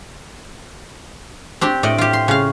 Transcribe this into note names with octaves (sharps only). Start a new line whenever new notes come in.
C4 D4 G4
A2 D5 D#5
F4 G4
C6
C#3 F5